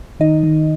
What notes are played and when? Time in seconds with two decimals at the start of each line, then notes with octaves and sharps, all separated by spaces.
0.20 D#3 D#4 D#5
0.43 D#3